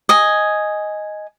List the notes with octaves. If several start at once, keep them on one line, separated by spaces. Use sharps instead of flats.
D#5 G#5